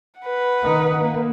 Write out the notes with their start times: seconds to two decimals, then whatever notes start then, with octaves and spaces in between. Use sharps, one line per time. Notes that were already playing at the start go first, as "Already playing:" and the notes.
0.21 B4 F#5
0.62 D#3 D#4
1.01 A#3